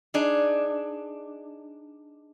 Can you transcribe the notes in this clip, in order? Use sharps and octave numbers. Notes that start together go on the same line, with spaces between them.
D4 D#4 G#4